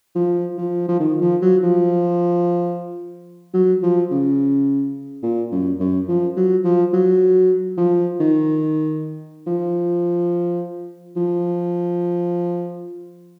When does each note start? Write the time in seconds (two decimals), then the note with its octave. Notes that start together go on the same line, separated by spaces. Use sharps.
0.15 F3
0.57 F3
0.88 F3
1.00 D#3
1.21 F3
1.42 F#3
1.63 F3
3.54 F#3
3.83 F3
4.11 C#3
5.23 A#2
5.52 F#2
5.80 F#2
6.08 F3
6.37 F#3
6.64 F3
6.93 F#3
7.77 F3
8.20 D#3
9.47 F3
11.16 F3